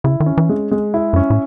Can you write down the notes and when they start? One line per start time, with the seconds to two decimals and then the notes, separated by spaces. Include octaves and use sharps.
0.04 C#3 E4
0.20 D#3
0.26 C#4
0.38 E3
0.49 G#3
0.72 G#3
0.94 E4
1.13 F#2 C#4
1.30 A2